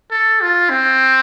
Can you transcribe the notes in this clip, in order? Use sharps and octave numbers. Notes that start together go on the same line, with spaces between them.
A4
F4
C4